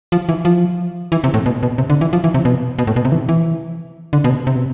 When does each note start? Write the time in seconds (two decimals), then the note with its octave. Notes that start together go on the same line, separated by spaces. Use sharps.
0.12 F3
0.29 E3
0.45 F3
1.12 E3
1.24 C3
1.34 A2
1.46 B2
1.63 B2
1.78 C3
1.90 D3
2.01 E3
2.13 F3
2.24 E3
2.34 C3
2.45 B2
2.78 B2
2.87 A2
2.96 B2
3.05 C3
3.12 E3
3.29 E3
4.13 D3
4.24 B2
4.30 C3
4.47 C3
4.56 B2